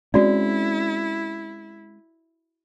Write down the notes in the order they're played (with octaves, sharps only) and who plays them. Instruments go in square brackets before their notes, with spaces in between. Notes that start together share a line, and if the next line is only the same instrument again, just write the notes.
[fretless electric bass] G#3 C4 C#4 [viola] E4 [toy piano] F#4 D5